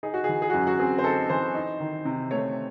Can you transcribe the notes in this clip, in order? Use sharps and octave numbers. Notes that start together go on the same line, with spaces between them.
D#4 G#4
F#4
E3 G#4
G#4
F#4
F#2
F#4
C4 G#4
C5
D#4 A4
E3 C5
D#4
D#3
C3
A3 C#5